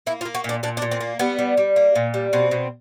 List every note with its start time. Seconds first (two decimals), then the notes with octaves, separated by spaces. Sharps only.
0.06 A#3 E4
0.21 F4
0.25 A#3
0.35 F#4
0.44 A#2 D4
0.63 A#2 D4
0.77 D4
0.82 A#2
0.91 C4
1.01 A#3
1.19 G3 B3
1.39 G3
1.57 G3
1.76 A#3
1.95 A#2
2.14 G3
2.33 B2 C4
2.51 B2